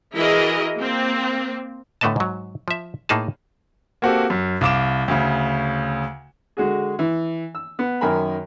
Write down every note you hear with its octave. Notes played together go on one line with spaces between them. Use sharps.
E3 E4 F#4 G#4 A#4 D#5
A#3 C4
A2 D3 A3 B3 D#5 A5
G#2 F#3
F3 E5
A2 A#3 D#4 G#4 A5
A#3 C4 F#4 G4 A4
F#2
C2 F5 D6 E7
D2 C#3
D3 G#3 F#4 G#4
E3
E6
B3
F#2 D#3 A#4 G#5 B5